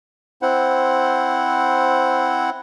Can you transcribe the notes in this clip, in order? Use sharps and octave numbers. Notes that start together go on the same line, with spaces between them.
C4 E4 C5 F#5